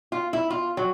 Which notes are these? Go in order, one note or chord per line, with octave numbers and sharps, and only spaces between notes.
F4
E4
F4
F#3